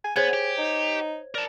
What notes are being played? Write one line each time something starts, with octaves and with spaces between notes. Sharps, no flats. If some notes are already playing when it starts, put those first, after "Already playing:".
G#5
B3 G#4 C5 C#5 G#6
G4
D#4
A#4 D5 A5